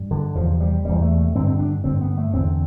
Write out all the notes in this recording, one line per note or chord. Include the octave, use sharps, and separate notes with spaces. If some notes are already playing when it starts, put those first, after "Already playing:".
Already playing: G2
D3
E2 F3
C3
G3
E2 C3 G3
A3
A3
G2 D3 C4
C4
D4
G2 D3 C4
B3
A3
E2 D3 C4